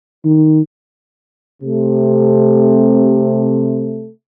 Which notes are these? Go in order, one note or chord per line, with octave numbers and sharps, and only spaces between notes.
D#3
C3 A3